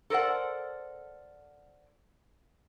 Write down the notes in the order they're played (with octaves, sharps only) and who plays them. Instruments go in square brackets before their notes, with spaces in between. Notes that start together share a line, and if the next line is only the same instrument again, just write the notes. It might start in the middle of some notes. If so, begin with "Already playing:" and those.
[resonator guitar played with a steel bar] A4 A#4 C5 D5 F#5